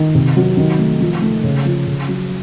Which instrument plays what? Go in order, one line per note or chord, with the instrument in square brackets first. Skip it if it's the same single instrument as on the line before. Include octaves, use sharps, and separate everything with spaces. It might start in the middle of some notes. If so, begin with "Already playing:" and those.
Already playing: [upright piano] D#3
C3
F#3
D#3
A3
F3
A3
C#3
F3
C#3
F#3